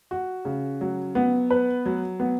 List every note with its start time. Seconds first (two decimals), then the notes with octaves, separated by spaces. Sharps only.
0.11 F#4
0.45 C#3
0.81 F#3
1.15 B3
1.50 B4
1.86 F#3
2.20 B3